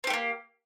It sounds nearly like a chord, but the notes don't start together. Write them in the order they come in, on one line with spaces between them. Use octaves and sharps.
C4 G4 A3 A#3